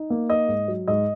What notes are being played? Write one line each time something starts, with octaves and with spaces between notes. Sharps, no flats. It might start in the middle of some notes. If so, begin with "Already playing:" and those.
Already playing: D#4
A#3
D#4 D#5
G#2
F#3
G#2 D#5